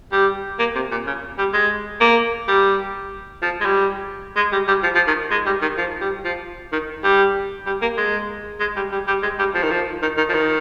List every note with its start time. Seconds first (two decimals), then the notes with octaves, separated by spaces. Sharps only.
0.12 G3
0.59 A#3
0.75 C3
0.91 A#2
1.07 C#3
1.38 G3
1.53 G#3
2.01 A#3
2.48 G3
3.42 F3
3.60 G#3
3.65 G3
4.36 G#3
4.52 G3
4.68 G3
4.83 F3
4.95 F3
5.07 D#3
5.31 G#3
5.46 G3
5.62 D#3
5.77 F3
6.01 G3
6.25 F3
6.72 D#3
7.04 G3
7.66 G3
7.82 A#3
7.97 G#3
8.60 G#3
8.76 G3
8.92 G3
9.08 G3
9.23 G#3
9.39 G3
9.55 F3
9.63 D#3
9.71 F3
10.02 D#3
10.17 D#3
10.29 F3
10.34 D#3